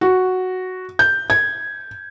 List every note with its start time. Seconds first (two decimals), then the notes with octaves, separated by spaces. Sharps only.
0.01 F#4
0.99 G6
1.30 G#6